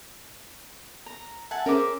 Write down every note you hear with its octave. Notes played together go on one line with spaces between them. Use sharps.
A#5
E5 F#5 G#5 A5
C#4 G#4 A#4 C5 E5 D6